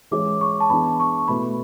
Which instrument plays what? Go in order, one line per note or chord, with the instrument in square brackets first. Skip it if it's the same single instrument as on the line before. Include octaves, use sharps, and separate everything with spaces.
[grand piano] E3 G#3 C#4 G#4 C#5 [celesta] D6
[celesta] C#6
A5
[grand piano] E3 B3 D4 G#4 [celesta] B5
[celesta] C#6
[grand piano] B2 A3 E4 B4 [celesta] B5